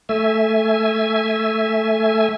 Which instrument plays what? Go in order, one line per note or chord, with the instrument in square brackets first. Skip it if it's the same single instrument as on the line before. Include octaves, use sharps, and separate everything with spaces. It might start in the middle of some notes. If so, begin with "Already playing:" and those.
[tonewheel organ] A3 E5 G#5